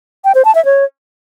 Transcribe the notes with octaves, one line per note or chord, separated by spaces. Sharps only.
G5
C5
A5
E5
C#5